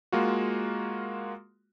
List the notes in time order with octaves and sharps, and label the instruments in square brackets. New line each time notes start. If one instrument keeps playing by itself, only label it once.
[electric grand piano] G#3 A#3 F4 F#4